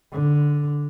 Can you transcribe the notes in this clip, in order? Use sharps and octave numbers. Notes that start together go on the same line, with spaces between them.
D3